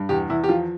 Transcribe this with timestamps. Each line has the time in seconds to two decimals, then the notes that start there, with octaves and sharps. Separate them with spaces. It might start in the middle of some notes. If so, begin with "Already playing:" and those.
Already playing: G2
0.09 E2 G4
0.30 E2 E4
0.44 G4
0.49 F3 F4